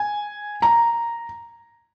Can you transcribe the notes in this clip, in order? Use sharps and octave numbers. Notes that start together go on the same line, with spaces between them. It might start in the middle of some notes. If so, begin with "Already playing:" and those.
Already playing: G#5
A#5